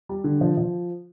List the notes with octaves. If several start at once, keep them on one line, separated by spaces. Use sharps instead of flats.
G3
D3
F3
F3